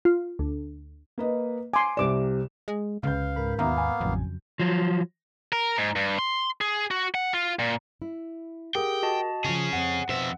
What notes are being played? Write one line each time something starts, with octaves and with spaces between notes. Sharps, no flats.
F4
D2
A#3 B4 D#5
G#5 C6 D6
C2 C3 D5 D6 E7
G#3
C#2 C#3 B4 F5 G6
G#2 A#4 B5
D#2 B2 A#3 B3 E5 F5 A#5
G#5
A1 F2 C#3 F#3
F3 F#3
A#4
G#2
G2
C6
G#4
F#4
F#5
F4
A#2
E4
G4 G#4 A#4 F#5 G5
F#4 D#5 A5
C#3 F3 G#4 C#5
F2 C4 F#5
F2 B2 C5 E5